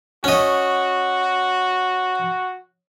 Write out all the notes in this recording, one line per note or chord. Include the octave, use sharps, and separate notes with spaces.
C#4 F#4 D#5